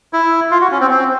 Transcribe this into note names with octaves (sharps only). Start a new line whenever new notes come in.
E4
F4
F#4
C#4
C4
C4